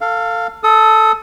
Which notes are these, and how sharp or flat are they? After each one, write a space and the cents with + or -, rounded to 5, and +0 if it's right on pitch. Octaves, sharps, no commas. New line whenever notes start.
A4 +25 F5 +0
A4 +0 D#6 +25